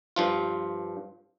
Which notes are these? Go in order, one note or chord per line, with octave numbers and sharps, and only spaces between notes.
G2 F3 F4